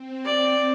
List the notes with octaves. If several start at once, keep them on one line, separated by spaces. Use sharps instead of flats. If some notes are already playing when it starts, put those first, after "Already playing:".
Already playing: C4
D5